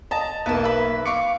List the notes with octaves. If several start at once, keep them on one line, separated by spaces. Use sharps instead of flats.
D#5 A5 A#5
B1 A#3 B3 E4 A5
B4 E5
F5 C#6 D6 C#7